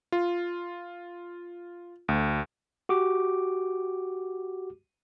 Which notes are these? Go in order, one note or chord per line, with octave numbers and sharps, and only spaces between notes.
F4
D2
F#4 G4 D6